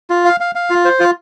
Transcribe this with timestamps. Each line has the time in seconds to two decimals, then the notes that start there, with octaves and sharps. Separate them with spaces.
0.10 F4
0.25 F5
0.40 F5
0.55 F5
0.70 F4
0.85 C5
1.00 F4